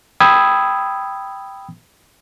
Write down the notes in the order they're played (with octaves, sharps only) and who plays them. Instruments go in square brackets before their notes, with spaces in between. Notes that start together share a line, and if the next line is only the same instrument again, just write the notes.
[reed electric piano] G5 B5 D#6 E6 G#6